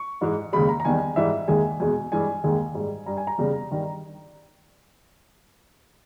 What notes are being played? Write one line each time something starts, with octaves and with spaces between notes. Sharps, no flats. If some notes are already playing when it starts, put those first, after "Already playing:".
Already playing: C#6
G#2 E3 G#3
D#2 C#3 G#3 B5
A#5
A#5
E2 D#3 G3 G#5
G#2 E3 G3 E5
D#2 D#3 G#3 G#5
E2 B2 G#3 G#5
G2 E3 G#3 G#5
D#2 D#3 G#3 G#5
G#2 G3
G2 G3 A#5
G#5
A#5
E2 C#3 G3
G2 D#3 G3